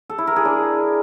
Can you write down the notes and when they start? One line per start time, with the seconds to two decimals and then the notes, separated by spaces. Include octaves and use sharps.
0.10 A4
0.18 E4
0.27 A#4
0.36 G#4
0.45 D4